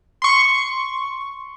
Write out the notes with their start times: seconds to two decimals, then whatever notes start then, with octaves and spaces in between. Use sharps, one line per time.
0.22 C6 C#6